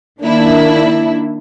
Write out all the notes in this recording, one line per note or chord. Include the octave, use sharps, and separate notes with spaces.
D#3 A#3 D4 E4